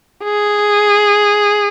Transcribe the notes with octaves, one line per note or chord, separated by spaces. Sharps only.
G#4